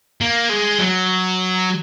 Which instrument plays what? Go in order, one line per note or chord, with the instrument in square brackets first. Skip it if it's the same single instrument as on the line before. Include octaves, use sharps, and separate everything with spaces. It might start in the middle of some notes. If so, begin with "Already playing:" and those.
[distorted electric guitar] A#3
G#3
F#3